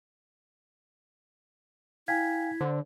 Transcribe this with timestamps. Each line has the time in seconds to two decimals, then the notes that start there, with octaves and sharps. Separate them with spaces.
2.08 E4 F5 G5 G#5 G#6 B6
2.61 D3 C5